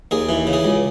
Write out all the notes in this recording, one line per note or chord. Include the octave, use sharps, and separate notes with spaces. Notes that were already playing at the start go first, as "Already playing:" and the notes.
D#2 G#4
E3
C#3
G#4
C#2